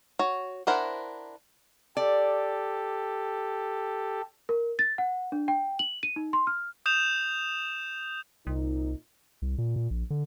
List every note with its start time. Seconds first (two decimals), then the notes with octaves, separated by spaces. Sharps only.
0.19 F#4 C#5
0.67 D4 E4 A#4 C5 F#5
1.97 G4 A4 D5
4.49 A#4
4.79 A6
4.98 F#5
5.32 D4
5.48 G5
5.79 F#7
6.03 D#7
6.16 D#4
6.33 C6
6.47 F6
6.86 D#6 G6 E7 F7
8.47 C2 A#2 C4 D#4
9.42 C2
9.58 A#2
9.76 A#2
9.91 A#1
10.10 D3